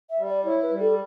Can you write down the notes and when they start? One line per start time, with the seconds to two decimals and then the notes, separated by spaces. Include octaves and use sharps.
0.10 E5
0.19 G3
0.28 D5
0.45 E4 C#5
0.62 B4
0.71 G3
0.80 A4